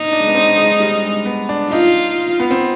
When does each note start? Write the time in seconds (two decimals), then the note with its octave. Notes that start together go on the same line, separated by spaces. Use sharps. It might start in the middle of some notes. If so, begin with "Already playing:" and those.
Already playing: D#4
0.13 D4
0.20 G#3
0.27 B3
0.35 C4
0.58 G#3
0.80 G3
1.03 G#3
1.25 B3
1.49 D4
1.71 D#4 F4
2.40 B3
2.51 C4